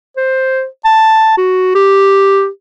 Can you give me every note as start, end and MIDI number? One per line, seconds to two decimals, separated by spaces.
0.17 0.66 72
0.85 1.34 81
1.37 1.73 66
1.75 2.48 67